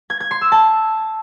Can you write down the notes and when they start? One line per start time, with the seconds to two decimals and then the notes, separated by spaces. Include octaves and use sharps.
0.10 G#6
0.20 G#6
0.31 C6
0.41 E6
0.52 A5